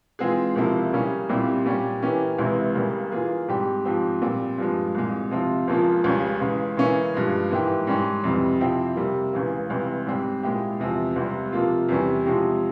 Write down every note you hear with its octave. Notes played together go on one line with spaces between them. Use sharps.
E3 G#3 C4 F4 G#4
C#2 C3 F3 A#3 E4
C#3 G3 A#3 C#4
C2 A#2 G3 C4 E4
A#2 G3 C#4 G4
E3 A#3 C#4 E4 G4
C#2 C3 E3 G#3 E4
C#2 C#3 G3 A#3
E3 A#3 F4 G#4
G#2 G3 C4 G4
G#2 F3 C4 G4
A#2 G3 C4
G2 F3 G#3
C2 A#2 G#3
C3 F3 C4 F4
C#2 C#3 F3 A#3 F4
C#2 C#3 G3 C#4
C#2 C#3 E3 G#3
C#3 E3 A#3 C#4 E4
G2 F3 G#3
G#2 E3 A#3 E4 G4
G#2 G3 C#4 G4
F2 C3 E3 G3
C3 F3 C4 E4 G4
C3 G3 A#3
C#2 C#3 E3
C#2 C3 E3 G3
G#2 G3 C4 G4
A#2 G#3 E4 G4
E2 C3 F3 C4
C#2 C3 G3
C3 F3 A#3 F4
E2 C3 E3 G3 C#4
C3 F3 G#3 C#4 G4